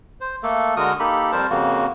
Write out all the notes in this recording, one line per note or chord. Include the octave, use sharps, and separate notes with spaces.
C5
A3 A#3 A4
D3 G#3 F#4 A#4 D#6
A#3 D#4 G4 A4 B5
F2 G3 A#4 C5 A5
F2 C#3 A#3 F#4